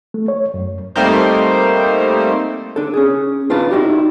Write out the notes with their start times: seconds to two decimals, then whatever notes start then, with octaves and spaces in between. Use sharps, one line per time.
0.14 A3
0.28 C#5
0.54 F#2
0.96 G3 A3 A#3 C4 D#4 C5
2.76 D4 A4
2.94 C#4 G#4
3.50 D4 F4 B4 D5 A5
3.70 D#4 E4 F#4 G4 D5